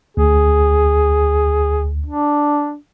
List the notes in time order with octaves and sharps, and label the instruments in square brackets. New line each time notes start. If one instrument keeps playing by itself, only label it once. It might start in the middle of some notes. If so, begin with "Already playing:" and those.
[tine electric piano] D2 [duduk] G#4
[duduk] D4